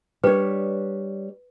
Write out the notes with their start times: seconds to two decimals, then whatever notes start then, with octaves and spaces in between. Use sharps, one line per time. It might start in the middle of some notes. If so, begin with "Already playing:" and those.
0.24 G3 D4 B4 C#5